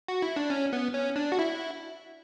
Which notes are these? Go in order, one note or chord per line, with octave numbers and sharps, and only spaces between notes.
F#4
E4
D4
C#4
B3
C#4
D4
F#4
E4